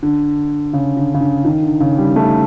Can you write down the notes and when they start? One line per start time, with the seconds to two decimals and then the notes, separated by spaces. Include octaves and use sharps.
0.03 D3
0.73 C#3
0.97 D3
1.14 C#3
1.21 D3
1.45 D#3
1.63 D3
1.80 C#3
1.98 G3
2.16 A3